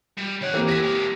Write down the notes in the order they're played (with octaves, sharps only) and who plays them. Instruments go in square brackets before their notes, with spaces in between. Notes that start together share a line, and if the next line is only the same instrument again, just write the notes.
[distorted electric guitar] G3
[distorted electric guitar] D#3 F#5 [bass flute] C#5
[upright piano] E3 A#3 C4 [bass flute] G4
[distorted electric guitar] E4 G#4 [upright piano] A#6 B6
[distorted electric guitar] G#3 A#3